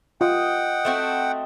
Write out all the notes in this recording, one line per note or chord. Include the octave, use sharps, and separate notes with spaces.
F4 D#5 F#5 G5
A3 C4 F#4